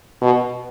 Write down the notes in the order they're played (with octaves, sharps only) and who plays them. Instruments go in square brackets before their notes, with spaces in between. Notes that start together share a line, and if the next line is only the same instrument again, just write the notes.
[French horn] B2